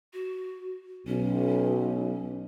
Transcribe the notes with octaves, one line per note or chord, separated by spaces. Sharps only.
F#4
B1 C#4